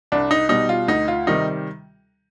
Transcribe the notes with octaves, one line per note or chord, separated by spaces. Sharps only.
C2 D4
D#4
B2 G3 D#4
F4
D2 D#4
F4
C3 D#3 G3 D#4